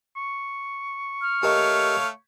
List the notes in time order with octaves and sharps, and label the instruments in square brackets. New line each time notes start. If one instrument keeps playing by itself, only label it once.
[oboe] C#6
[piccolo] F6
[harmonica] A3 C#5 F5 [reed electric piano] G4 A#4 D#5